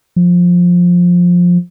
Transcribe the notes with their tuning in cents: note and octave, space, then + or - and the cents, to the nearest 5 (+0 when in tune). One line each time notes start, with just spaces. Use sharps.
F3 +15